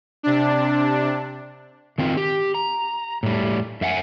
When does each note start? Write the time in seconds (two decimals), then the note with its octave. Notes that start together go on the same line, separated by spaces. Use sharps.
0.23 C3 D4
1.98 D#3 C4 F4
2.17 G4
2.54 A#5
3.23 A2 G3
3.81 F#2 E5 F#5 G#5